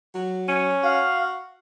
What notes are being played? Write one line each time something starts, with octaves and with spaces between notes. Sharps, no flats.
F#3
C#4
F#4 F5